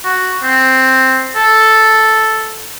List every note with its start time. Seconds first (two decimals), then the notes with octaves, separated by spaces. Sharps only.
0.04 F#4
0.43 C4
1.36 A4